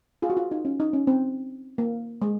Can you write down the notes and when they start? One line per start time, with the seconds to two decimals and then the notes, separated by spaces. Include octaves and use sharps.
0.22 F4 G#4
0.30 F#4
0.37 F4
0.51 D#4
0.65 C#4
0.80 D#4
0.93 C#4
1.07 C4
1.78 A#3
2.22 G#3